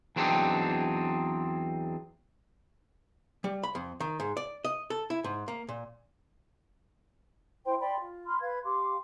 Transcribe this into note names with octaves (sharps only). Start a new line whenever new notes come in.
E2 F#3 C4 D4 D#4 G4
G3
B5
F2
D#3
G#2
D5
D#5
A4
E4
G#2
A#3
A#2
E4 C5 G5 C6
D5 G5 B5 C6
F4
B5 C6 F6
B4 F5 G#6
G4 F5 C6 D6